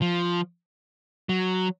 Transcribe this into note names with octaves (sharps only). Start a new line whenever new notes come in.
F3
F#3